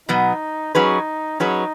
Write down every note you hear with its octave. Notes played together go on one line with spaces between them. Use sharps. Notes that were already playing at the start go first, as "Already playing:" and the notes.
B2 F#3 B3 D#4
F#3 C#4 D#4 G#4 B4
F#3 C#4 D#4 G#4 B4